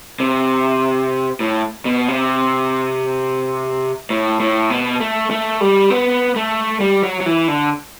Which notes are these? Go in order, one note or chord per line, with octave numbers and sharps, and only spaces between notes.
C3
A2
B2
C3
A2
A2
B2
A3
A3
G3
B3
A3
G3
F#3
F#3
E3
D3